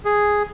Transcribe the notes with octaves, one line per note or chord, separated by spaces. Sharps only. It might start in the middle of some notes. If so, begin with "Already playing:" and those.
G#4